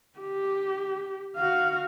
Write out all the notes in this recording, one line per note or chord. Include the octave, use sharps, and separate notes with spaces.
G4
F#4 F5